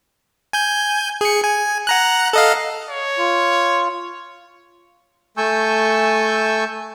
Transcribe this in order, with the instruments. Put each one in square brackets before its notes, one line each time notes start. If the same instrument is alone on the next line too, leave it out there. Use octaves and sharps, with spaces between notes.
[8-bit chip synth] G#5 G6
G#4 C#7
G#5
F#5 A#5 F#6
A4 D#5 F5
[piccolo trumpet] C#5
[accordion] F4
[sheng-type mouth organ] A3 G#5 A5 C#6 E6 G6